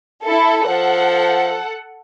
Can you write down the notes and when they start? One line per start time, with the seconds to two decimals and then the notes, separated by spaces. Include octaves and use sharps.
0.24 E4 A4
0.67 F3 A4 F#5